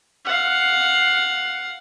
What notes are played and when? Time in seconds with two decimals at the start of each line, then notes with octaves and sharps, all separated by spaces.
0.25 F5 F#5